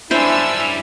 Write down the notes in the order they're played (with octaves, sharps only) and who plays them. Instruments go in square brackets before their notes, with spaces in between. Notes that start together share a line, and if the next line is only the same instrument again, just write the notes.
[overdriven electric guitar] F#2 G3 [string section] D4 G#5 E6 [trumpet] E4 [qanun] C5 E5